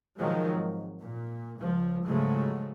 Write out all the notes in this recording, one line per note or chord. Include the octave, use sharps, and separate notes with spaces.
B2 D#3 F3 F#3 G#3
G#1
A#2
C#2 F3
G#2 C#3 F3 F#3 G#3 A3